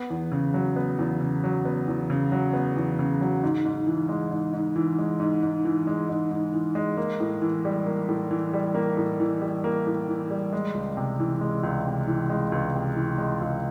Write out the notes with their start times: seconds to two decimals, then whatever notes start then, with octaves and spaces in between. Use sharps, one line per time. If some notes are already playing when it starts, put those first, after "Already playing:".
Already playing: B3
0.10 E2
0.32 C#3
0.54 F#3
0.76 B3
0.99 E2
1.21 C#3
1.44 F#3
1.65 B3
1.88 E2
2.10 C#3
2.32 F#3
2.53 B3
2.77 E2
2.99 C#3
3.21 F#3
3.43 G#2
3.65 G#2
3.87 E3
4.09 G#3
4.31 G#2
4.54 G#2
4.76 E3
4.99 G#3
5.20 G#2
5.43 G#2
5.65 E3
5.87 G#3
6.09 G#2
6.31 G#2
6.54 E3
6.75 G#3
6.97 A#3
7.20 A2
7.42 E3
7.65 G3
7.86 A#3
8.09 A2
8.31 E3
8.53 G3
8.75 A#3
8.97 A2
9.20 E3
9.42 G3
9.64 A#3
9.86 A2
10.08 E3
10.31 G3
10.53 G#3
10.74 C#2
10.97 C3
11.20 E3
11.41 G#3
11.63 C#2
11.86 C3
12.07 E3
12.30 G#3
12.52 C#2
12.75 C3
12.96 E3
13.18 G#3
13.41 C#2